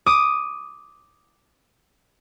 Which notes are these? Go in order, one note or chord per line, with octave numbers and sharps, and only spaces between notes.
D6 D#6